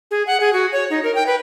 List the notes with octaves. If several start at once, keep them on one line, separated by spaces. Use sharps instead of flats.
G#4
F#5
G#4
F#4
C#5
D#4
A#4
G5
B4